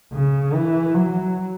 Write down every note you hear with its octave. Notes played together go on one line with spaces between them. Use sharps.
C#3
E3
F#3